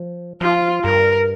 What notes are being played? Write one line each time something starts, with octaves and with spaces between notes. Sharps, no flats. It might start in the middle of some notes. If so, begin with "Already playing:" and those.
Already playing: F3
F3 F4
G2 A#4